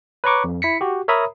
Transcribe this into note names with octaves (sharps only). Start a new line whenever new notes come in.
B4 C#5 A#5 C#6 D6
F2
E4 B6 C#7
F#4 G4
A#4 C#5 E5 A#5 B5 D#6